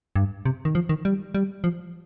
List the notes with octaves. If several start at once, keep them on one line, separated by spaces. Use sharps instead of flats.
G2
C3
D#3
F3
D#3
G3
G3
F3